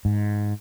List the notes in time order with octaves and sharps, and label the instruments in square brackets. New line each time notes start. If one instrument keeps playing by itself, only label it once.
[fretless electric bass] G#2